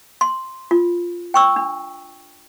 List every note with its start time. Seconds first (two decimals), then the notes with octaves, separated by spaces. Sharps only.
0.21 C6
0.71 F4
1.34 G5 C#6 E6
1.56 D4